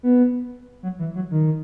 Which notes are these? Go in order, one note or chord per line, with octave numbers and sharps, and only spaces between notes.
B3
F#3
E3
F#3
D#3